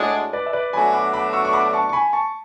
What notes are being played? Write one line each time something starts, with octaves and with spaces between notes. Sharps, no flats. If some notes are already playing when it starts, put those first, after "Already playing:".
Already playing: A2 G#3 D4 F#4
B4 D5
E5
B4 D5
B2 F#3 A3 D4 F#4 G#5 B5
B5 D6
B5 D6
C#6 E6
C#6
B5 D6
A5 C#6
C#6
G#5 B5
A5 C#6